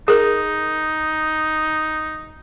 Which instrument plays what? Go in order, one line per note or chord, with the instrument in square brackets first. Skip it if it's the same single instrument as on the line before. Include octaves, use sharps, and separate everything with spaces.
[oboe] D#4 [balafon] G#4 A#4